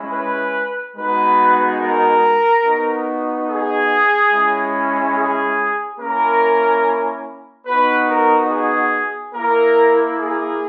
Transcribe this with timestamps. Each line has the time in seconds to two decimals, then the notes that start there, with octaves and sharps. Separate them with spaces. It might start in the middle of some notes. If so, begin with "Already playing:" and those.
Already playing: G#3 C#4 E4
0.13 B4
0.97 G#3 B3 D#4 F#4 B4
1.81 A#4
2.64 B3 D#4 F#4
3.48 G#4
4.32 G#3 C#4 E4
5.16 G#4
5.99 A#3 C#4 E4 A#4
7.66 B3 D#4 F#4 B4
8.08 A#4
8.50 G#4
9.34 A#3 E4 A#4
10.18 G#4